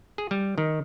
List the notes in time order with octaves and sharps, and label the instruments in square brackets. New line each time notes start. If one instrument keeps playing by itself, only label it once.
[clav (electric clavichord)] G#4
G3
D#3